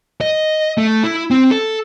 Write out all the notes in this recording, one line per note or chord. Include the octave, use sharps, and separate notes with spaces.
D#5
A3
E4
C4
A4